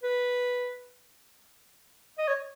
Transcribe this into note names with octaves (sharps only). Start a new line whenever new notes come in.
B4
D#5
C#5